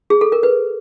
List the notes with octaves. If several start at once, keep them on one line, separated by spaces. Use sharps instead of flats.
G#4
A4
A#4
B4